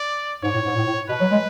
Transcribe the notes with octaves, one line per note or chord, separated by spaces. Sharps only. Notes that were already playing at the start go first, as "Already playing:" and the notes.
Already playing: D5
G#2 C#5
A2
G#2
A2
A2
B2 B4
F#3
G#3